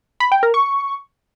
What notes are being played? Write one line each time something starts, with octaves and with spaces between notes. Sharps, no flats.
B5
G5
A#4
C#6